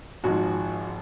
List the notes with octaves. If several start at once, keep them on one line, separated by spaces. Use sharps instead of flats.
G#1 G#2 F3 F#4